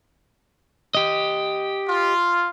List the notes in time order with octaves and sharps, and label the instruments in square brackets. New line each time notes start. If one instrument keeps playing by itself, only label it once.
[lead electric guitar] G4 D#5
[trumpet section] F4